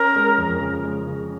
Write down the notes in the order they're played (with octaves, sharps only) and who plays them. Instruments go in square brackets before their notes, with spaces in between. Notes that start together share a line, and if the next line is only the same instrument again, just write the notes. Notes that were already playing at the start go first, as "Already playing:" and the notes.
Already playing: [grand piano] C#4 [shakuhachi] A#4
[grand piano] G#3
F2
C#3
G#3
C#3